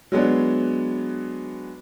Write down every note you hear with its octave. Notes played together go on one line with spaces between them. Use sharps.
F#3 G#3 B3 D4